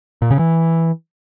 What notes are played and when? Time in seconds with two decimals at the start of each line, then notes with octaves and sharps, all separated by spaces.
0.22 A#2
0.31 C#3
0.39 E3